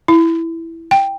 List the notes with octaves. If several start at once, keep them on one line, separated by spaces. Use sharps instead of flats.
E4
G5